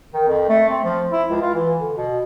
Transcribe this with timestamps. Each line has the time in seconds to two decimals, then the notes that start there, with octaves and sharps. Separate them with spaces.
0.14 D#3
0.27 F2
0.49 A3
0.69 C4
0.84 F3
1.12 E4
1.30 C#2
1.42 F4
1.54 E3
1.79 D3
1.97 B2